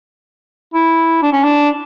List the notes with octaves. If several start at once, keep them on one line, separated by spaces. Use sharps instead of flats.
E4
D4
C#4
D4